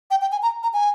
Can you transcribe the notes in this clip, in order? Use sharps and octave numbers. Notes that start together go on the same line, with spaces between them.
G5
G5
G#5
A#5
A#5
G#5